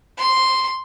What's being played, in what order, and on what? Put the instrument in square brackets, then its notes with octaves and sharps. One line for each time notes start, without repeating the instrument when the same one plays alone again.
[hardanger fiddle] C6